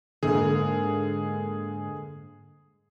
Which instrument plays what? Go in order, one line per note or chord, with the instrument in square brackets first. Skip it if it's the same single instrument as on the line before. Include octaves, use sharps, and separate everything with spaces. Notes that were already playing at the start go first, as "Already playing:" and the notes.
[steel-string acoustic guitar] G#2 [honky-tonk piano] D3 G#3 A#3 [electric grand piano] G#4